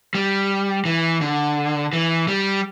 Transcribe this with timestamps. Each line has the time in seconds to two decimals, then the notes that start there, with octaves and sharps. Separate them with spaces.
0.15 G3
0.85 E3
1.21 D3
1.93 E3
2.28 G3